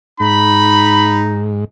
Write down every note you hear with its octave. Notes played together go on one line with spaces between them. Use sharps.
G#2 D#4 B5